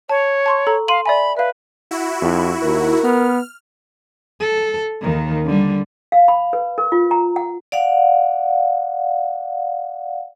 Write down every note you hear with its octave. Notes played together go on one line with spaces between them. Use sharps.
C#5 A5
A5 C6 C#6
A4 A#5
F5 C6 D#7 F#7
D5 E5 G#5 B5
B4 E5 F5
E4 F#4
F2
D#2 A#4
B3 F6
A4
D#2 D#3
D3 G3
F5
B5
B4
A#4
F4
A#5
F#5
D5 F5 F#5